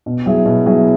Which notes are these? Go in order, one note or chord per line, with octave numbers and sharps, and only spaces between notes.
B2
F#3 E4 G#4
B2
F#3 E4 G#4